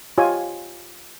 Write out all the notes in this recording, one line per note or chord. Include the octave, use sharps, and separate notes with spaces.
F4 G4 C#5 D#5 G#5